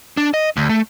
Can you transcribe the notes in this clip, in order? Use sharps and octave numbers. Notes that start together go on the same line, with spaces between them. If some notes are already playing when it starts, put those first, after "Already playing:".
D4
D#5
D2
A3